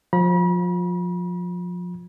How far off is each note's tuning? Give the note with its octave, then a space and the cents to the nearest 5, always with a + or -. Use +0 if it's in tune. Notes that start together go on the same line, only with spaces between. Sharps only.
F3 +30 B5 -40